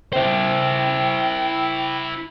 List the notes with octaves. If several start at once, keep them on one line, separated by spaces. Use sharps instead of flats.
E4 C5 G5